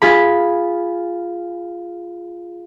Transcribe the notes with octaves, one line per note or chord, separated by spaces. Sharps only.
F4 G#4 B5